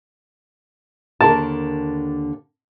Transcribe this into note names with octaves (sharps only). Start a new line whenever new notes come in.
D#2 D3 A#4 A5